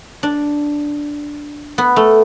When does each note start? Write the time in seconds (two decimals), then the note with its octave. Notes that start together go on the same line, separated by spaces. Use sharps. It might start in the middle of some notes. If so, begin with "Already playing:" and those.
0.23 D4
1.78 B3
1.96 A3